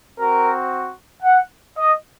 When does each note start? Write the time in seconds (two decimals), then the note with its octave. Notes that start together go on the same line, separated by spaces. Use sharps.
0.18 C4 F#4 A#4
1.23 F#5
1.76 D#5